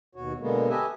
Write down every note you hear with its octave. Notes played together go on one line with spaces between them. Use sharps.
D#2 B2 F#4 C#5
B2 D3 G#3 A#3 B3
G4 A4 B4 D#5 E5 G#5